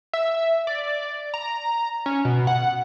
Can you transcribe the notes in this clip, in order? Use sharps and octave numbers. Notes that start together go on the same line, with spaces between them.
E5
D5
A#5
C#4
B2
F#5